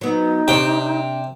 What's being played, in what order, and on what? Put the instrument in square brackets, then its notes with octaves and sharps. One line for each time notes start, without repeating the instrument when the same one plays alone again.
[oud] F#3 B3 [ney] D#4
[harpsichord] C3 G5 [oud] D4 C#5